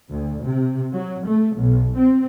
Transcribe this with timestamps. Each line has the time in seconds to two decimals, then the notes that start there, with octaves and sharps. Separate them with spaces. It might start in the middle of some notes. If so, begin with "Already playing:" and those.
0.10 D2
0.45 C3
0.94 F#3
1.27 A3
1.56 B1
1.97 C4